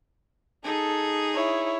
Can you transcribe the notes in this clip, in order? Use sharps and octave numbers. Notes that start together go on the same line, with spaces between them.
D#4 G#4 A4
E4 C#5